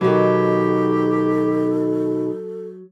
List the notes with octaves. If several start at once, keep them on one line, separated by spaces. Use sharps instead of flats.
B2 D#3 F#3 G4 A4